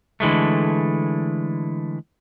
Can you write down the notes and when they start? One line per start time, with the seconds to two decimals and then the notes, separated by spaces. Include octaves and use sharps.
0.20 D3 E3 G#3 A3